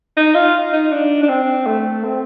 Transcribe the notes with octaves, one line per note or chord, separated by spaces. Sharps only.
D#4
F4
D#4
D4
D4
C4
A3
C4